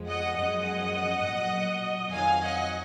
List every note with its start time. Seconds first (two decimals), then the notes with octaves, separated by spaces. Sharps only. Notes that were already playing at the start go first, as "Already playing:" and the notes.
Already playing: F2 F3 G#3
0.08 D#5 F#5
0.38 F#2 F3 G#3 D#5 F#5
1.25 A#2 F#3
2.13 F2 D#3 F#3 F5 G#5
2.42 D#5 F#5